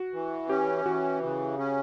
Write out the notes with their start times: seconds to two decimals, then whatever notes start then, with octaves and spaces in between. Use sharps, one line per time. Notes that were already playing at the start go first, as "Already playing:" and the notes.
Already playing: F#4
0.13 E3
0.49 C#4 G4
0.85 E3 F#4
1.22 C#3
1.58 C#4